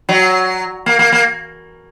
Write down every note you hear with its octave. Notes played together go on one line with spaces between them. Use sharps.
F#3
A#3
A#3
A#3